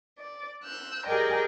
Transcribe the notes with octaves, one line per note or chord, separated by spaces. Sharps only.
D5
E6 F#6 G6
G4 G#4 A#4 D5 D#5 G5